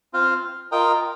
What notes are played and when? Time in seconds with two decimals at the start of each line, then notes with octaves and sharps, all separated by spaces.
0.13 C4 F4 C5 F5
0.72 F4 A#4 D#5 G5